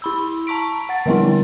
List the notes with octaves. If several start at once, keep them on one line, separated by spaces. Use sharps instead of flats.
E4 B5 E6
A5 A#5 C#6 B6 D7
F#5 A6
D3 F3 G3 B3 C4 E4